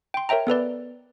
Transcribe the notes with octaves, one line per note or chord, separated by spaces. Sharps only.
G5 C6
A#4 C#5 E5 G5 A#5
B3 A4 B4 D5